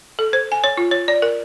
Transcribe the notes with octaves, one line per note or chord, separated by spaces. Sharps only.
A4
C5
G#5
C#5
F4
C#5
D5
A#4